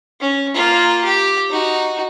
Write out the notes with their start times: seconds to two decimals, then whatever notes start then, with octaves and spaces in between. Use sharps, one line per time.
0.21 C#4
0.55 A#3 F4
1.05 G4
1.50 D#4 F#4